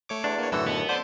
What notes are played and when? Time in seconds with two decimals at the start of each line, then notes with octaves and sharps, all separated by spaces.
0.09 A3 C#5 D6
0.24 E2 D4
0.39 A#3 C#5
0.52 F#2 A2 D3 E3 F#4 A4 E6
0.67 D#2 B3
0.89 D3 C5 A5 C6 D6